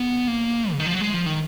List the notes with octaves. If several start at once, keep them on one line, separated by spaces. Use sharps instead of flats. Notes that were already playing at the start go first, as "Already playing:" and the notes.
Already playing: B3
A#3
C#3
D#3
F3
F#3
G#3
F3
D#3